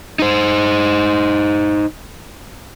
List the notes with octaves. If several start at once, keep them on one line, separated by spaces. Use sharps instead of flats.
D#4 C5